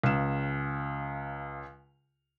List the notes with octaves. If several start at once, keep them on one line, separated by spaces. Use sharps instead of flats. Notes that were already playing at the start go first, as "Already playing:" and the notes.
C#2 C#3 E7